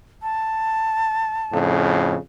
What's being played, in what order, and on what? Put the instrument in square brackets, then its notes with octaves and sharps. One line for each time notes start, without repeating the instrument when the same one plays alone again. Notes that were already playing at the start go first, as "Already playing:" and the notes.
[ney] A5
[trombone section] F2 A2 C#3